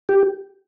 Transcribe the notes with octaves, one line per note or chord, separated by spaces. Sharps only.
G4